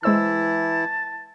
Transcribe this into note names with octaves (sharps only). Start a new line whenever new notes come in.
E3 G#3 E4 C5 A5 E6